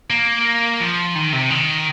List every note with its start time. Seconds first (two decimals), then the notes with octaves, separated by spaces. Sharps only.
0.10 A#3
0.81 F3
1.16 D#3
1.33 C3
1.50 D#3